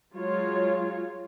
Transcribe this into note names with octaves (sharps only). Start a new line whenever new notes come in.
F#3 G#3 F4 C#5